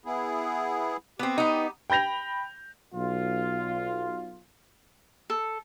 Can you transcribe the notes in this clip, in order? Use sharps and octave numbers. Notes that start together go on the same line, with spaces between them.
B3 E4 G#4
B3 C4 G4
B3 D#4
G5 B5 G6 A#6 F7
B1 F4
A4